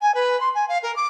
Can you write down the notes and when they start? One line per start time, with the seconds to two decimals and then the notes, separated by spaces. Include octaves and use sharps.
0.01 G#5
0.14 B4
0.40 C6
0.55 G#5
0.68 F5
0.83 A#4
0.96 D6